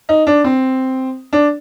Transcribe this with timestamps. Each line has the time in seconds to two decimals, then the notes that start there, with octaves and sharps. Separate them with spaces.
0.09 D#4
0.27 D4
0.44 C4
1.33 D4